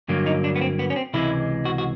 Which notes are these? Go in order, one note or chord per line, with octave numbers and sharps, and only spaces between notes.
G2 D3 F#3 A#3
D#4
D4
B3
C4
B3
C#4
C4
C#2 C3 E3 G#3 E4
F#4
F#4